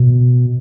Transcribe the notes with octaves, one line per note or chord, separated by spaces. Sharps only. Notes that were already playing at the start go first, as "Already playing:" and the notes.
Already playing: B2